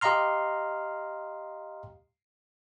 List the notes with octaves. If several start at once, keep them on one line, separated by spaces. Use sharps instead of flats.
G4 D#5 F5 A#5 C6 F6